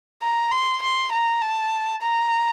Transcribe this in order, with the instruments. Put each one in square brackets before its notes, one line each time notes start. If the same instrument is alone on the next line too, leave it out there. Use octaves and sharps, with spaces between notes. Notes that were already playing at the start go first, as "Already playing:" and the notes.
[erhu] A#5
C6
C6
A#5
A5
A#5